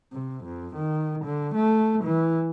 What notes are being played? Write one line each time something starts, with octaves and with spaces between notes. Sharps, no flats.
C3
F2
D#3
D3
A3
E3